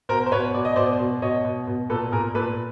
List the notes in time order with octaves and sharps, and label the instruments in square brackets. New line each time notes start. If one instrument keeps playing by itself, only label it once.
[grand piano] B2 A#4 C5
C5
B2 B4 C#5
B2 D5
D#5
B2 C5 D5
B2
B2 C#5 D#5
B2
B2
A#2 A4 B4
A#2 G#4 A#4
A#2 A4 B4